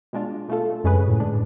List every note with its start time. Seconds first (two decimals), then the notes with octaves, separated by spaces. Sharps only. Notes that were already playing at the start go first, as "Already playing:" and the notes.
0.13 B2 G#3 D4 F4
0.49 B2 A3 F4 A4
0.84 F#2 C#3 G#3 C#4 G#4 B4
1.08 A2
1.20 D3 G#3 D4